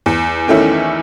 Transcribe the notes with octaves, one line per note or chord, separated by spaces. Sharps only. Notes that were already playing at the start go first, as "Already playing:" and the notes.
E2
D#3 A3 C#4 E4